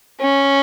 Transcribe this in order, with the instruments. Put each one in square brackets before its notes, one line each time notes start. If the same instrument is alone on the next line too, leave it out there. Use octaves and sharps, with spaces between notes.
[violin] C#4